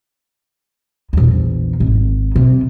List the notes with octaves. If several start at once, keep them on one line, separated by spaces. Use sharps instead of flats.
A#1 E2
G#1
C3